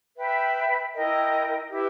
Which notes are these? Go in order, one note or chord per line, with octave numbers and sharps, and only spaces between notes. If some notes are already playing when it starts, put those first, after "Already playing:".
B4 E5 G5 B5
E4 A#4 D#5 G5
E4 G4 B4 E5